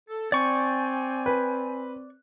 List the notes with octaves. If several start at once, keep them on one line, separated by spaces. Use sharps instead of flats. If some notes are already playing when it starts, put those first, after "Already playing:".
A4
C4 D5 G5 G#5 C#6
B4